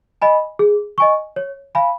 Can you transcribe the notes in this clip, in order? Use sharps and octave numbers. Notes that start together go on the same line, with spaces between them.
D#5 G#5 B5
G#4
D#5 G#5 C#6
C#5
F5 G#5 B5